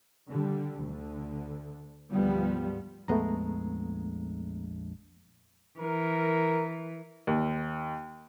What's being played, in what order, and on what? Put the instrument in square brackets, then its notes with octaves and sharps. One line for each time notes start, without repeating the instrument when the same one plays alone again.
[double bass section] D3 G3
D2 D3
D2 G#2 F3 G3 B3
[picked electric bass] A#1 F2 G#3 [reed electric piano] A3 B3 A#5
[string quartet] E3 [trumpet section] A#4
[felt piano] D#2